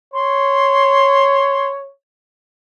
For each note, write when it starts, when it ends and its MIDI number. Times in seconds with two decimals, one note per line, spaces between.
0.14 1.91 73
0.14 1.68 84